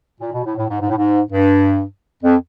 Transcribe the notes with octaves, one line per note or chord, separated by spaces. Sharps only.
A#2
B2
A2
A2
G#2
G#2
A2
G#2
G2
F2